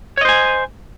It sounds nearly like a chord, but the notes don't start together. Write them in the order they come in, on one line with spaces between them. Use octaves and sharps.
C#5 D#5 C5 G#5